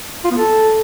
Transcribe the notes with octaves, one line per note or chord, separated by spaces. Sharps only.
F4
B3
A4